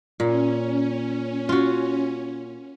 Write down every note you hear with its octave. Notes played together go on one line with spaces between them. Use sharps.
A#2 C#4
F4 F#4